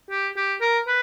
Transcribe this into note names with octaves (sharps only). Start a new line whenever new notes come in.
G4
G4
A#4
B4